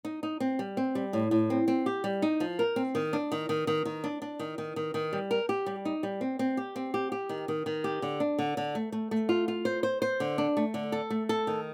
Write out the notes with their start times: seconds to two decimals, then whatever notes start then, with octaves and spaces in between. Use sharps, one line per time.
0.05 D#4
0.23 D#4
0.40 C4
0.59 G3
0.77 C4
0.95 G3
1.13 A2
1.31 A2
1.50 C4
1.68 C4
1.86 G4
2.04 G3
2.22 D#4
2.40 F3
2.59 A#4
2.76 C4
2.95 D#3
3.13 D4
3.32 D#3
3.49 D#3
3.67 D#3
3.85 D#3
4.04 D4
4.22 D4
4.39 D#3
4.58 D#3
4.76 D#3
4.94 D#3
5.13 G3
5.31 A#4
5.49 G4
5.66 G3
5.85 D#4
6.03 G3
6.21 C4
6.39 C4
6.57 G4
6.76 C4
6.94 G4
7.12 G4
7.29 D#3
7.48 D#3
7.66 D#3
7.84 G4
8.02 D3
8.20 D4
8.39 D3
8.57 D3
8.75 A3
8.92 A3
9.11 A3
9.29 F4
9.48 F4
9.65 C5
9.83 C5
10.02 C5
10.20 D3
10.38 D4
10.57 A3
10.74 D3
10.92 A4
11.10 A3
11.29 A4
11.47 D#3